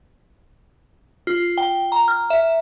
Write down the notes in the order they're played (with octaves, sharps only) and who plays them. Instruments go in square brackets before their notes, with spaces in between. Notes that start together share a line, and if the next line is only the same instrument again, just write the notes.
[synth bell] F4
G5
A#5
F6
E5